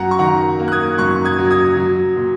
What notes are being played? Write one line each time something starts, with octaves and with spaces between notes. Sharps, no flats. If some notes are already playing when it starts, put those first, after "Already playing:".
Already playing: F#2 F#3 A#3 F#5 A#5
C#6
D#3 F#5 A#5
A#3
F#6
D#6 G#6
F#2 C#6 F#6
D#6 G#6
F#3
D#6 G#6
F#3
A#2